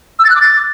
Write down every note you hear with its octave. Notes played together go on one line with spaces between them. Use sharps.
E6
A6
F#6
D6
A6